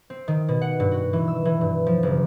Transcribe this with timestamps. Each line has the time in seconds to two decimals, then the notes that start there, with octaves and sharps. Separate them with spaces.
0.10 C4
0.28 D#3
0.48 B2
0.62 F#5
0.80 G2
0.92 F#4
1.13 E3
1.28 E6
1.45 E3
1.61 G2
1.87 F3
2.03 F#1